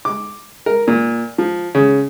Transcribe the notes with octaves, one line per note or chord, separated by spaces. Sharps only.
D6
A#4
A#2
F3
C#3